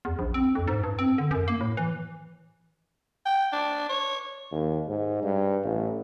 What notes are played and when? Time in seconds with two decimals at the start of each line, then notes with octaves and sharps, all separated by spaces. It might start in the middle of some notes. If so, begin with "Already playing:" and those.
0.05 E2
0.19 A#1
0.34 C4
0.55 F2
0.68 G#2
0.84 G2
0.99 C4
1.18 D3
1.31 F#2
1.48 A#3
1.61 A2
1.77 E3
3.26 G5
3.52 D4
3.89 C#5
4.51 D#2
4.88 G#2
5.23 G2
5.64 A1